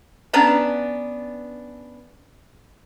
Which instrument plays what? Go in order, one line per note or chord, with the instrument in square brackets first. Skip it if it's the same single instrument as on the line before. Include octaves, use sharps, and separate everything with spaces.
[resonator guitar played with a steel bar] B3 C#4 D4 B4 A5 A#5